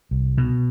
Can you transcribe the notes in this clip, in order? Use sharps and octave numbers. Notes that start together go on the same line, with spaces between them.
C2
B2